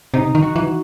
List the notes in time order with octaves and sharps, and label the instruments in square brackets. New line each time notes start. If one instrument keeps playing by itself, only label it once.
[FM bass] C3 [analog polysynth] D#4
[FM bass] D#3
[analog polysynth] F#4
[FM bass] E3